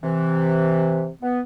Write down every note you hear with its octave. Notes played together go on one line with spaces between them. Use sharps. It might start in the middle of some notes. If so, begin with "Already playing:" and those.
C3 E3
B3